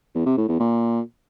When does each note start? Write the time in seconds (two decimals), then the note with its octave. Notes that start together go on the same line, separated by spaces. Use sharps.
0.15 E2
0.26 C3
0.37 A2
0.48 E2
0.60 A#2